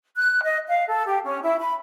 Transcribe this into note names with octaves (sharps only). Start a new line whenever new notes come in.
F#6
D#5
F5
A4
G4
C#4
E4
B5